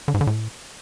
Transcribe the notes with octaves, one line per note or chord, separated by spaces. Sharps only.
D3
G#2
D3
A2